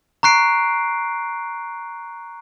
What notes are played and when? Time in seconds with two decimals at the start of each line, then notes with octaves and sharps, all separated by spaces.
0.23 A#5 C#6 F#6 C7 D7